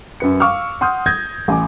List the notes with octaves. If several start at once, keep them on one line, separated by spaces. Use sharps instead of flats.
F#2 B4 C#7
F5 C#6 D6 E6 F6
F#5 C6 D#6 F6 G6
D#6 G6 G#6 A#6
A1 G#5 D6